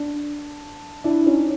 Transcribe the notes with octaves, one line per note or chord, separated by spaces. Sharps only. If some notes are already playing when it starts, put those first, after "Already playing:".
Already playing: D4
D4 E4
C#4 D#4